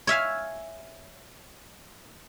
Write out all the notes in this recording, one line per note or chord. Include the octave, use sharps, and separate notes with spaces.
C#5 E5 F5 G#5